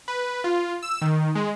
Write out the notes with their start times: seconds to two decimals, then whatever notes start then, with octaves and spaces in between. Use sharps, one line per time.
0.08 B4
0.44 F4
0.83 E6
1.01 D#3
1.35 G#3